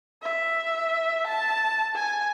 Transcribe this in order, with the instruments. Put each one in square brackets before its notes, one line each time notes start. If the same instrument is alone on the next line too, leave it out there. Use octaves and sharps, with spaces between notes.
[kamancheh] E5
A5
G#5